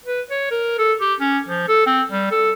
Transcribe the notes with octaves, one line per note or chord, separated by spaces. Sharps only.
B4
C#5
A#4
A4
G4
C#4
F3
A4
C4
G3
A4